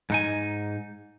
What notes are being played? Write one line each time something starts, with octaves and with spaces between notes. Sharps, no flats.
G#2 D#4 G#5